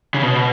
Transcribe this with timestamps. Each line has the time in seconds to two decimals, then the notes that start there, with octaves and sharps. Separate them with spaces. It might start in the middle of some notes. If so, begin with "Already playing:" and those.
0.14 C#3
0.23 B2